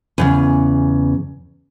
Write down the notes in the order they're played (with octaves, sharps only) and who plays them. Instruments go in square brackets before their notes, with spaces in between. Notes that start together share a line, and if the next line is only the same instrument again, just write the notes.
[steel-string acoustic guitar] E2 A#2 C#3